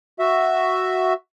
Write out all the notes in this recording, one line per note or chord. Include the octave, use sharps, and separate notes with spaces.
F#4 E5